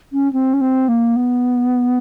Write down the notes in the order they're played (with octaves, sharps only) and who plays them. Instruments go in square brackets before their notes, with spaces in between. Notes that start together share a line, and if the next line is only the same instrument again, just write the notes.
[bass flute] C#4
C4
C#4
C4
A#3
B3